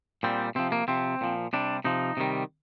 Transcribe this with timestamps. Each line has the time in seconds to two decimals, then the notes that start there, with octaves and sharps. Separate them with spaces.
0.23 A#2 G3 C4
0.55 C3 F3 C4
0.72 A#3
0.88 C3 F3 C4
1.21 A#2 F3
1.53 C3 G3 D4
1.84 C3 F3 D#4
2.17 C3 D#3 G3